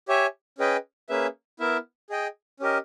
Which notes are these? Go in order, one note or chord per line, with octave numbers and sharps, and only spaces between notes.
G4 C#5 E5 G#5
C#4 G#4 B4 D#5 G5
A#3 C#4 G#4 B4 E5
B3 E4 A#4 E5
G#4 D#5 G5
C#4 G4 A#4 D#5